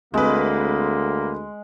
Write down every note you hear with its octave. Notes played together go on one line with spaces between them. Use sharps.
D2 G#3 A#3 C4 B4